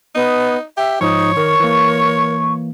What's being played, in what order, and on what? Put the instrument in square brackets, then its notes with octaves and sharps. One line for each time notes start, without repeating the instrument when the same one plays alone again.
[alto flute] B3 [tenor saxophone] D#4
[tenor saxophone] G4 [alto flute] E5
[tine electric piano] G#2 F3 [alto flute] D#4 [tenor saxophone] C#5
[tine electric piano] D#3 [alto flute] A#4 [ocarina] C#6
[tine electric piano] E3 A#3